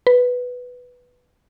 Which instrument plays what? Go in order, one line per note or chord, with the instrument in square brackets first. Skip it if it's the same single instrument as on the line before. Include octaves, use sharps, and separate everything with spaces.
[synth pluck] B4